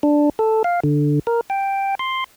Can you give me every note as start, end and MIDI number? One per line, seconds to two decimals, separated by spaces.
0.03 0.30 62
0.39 0.63 69
0.64 0.80 77
0.84 1.19 50
1.27 1.41 70
1.50 1.95 79
1.99 2.24 84